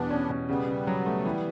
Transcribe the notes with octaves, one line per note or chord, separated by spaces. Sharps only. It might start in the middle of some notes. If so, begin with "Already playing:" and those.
Already playing: E2 B2 G3 B3 D4
C#4
B2
C#3 G3 B3
C#3
F#3
A3
E3